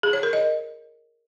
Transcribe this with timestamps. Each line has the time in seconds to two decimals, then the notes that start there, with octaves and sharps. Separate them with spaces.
0.03 G#4
0.13 C#5
0.23 A#4
0.33 D#5